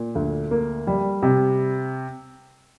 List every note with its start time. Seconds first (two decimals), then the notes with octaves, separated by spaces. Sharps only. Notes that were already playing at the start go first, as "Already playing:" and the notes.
Already playing: A#2
0.15 D2
0.51 A#3
0.87 G3
1.23 C3